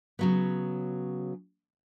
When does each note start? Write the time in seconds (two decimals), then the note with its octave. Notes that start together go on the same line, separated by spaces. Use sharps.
0.19 C#3 F#3 B3